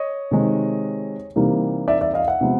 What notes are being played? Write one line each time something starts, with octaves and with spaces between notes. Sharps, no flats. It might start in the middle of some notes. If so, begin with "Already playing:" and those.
Already playing: C#5 D#5
C3 D#3 G#3
C3 E3 G3 A#3 D#4
D5 E5
D5 E5
D#5 F5
E5 F#5
C3 F3 G#3 B3